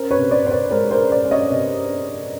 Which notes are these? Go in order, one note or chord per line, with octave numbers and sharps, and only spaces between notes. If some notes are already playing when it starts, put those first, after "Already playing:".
Already playing: C#4 A#4 C5
B4 C#5
C3
C5 D5
C3 C5
B4 C#5
G#3 A#4 C5
A#4 C5
C#4
C5 D5
C#4
C#5 D#5
C3